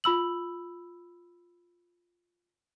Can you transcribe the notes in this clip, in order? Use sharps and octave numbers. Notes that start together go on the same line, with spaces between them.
F4 B5 E6 F#7